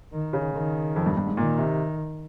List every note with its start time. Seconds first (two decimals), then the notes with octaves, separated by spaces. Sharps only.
0.13 D#3
0.33 C#3
0.54 D#3
0.96 F2
1.06 G2
1.17 G2
1.27 G#2
1.37 A#2 D#3
1.58 C3